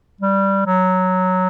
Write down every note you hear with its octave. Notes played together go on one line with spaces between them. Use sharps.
G3
F#3